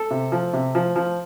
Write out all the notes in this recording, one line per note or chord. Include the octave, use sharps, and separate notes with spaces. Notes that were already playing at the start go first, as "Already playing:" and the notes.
Already playing: A4
C3
F3
C3
F3
F3